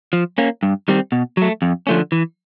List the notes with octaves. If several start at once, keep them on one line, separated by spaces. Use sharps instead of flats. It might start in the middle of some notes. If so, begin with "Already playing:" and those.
F3
A#3 C#4
G2
D#3 G3 C4
B2
F#3 A3
F2
D3 F3 A3 C#4
E3